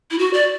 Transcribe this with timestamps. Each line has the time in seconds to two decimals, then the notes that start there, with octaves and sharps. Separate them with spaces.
0.11 E4
0.19 F#4
0.33 D5